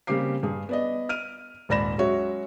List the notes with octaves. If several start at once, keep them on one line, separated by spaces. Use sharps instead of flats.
C#3 G3 A#3 C4 D6 C7
G2 G#4
B3 D5 D#5
F6 D7 D#7
D#1 G#2 D5 B5 A#6 E7
F#3 G#3 C#4 F#4 C#5 E5